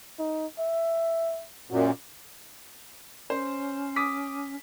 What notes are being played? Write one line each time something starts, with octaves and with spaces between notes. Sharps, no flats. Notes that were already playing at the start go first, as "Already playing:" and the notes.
D#4
E5
F#2 A#2 F#4
C#4 C5
D6 D#6 B6